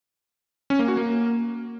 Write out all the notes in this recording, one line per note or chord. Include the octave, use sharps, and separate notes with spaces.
C#4
A#3
F#4
A#3